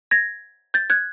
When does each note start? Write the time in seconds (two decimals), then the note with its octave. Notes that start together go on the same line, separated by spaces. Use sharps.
0.11 G#6 A#6
0.74 G6 A6
0.90 F#6 G#6